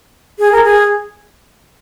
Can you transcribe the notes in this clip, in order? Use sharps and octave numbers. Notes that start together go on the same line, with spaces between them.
G#4
A#4
G#4